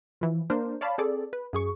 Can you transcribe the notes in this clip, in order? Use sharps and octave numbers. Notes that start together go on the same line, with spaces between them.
E3 F3
A#3 D4 A#4 C5
C#5 D5 F5 A5 B5
C4 G#4 A4 D5
B4
F#2 G#4 C#6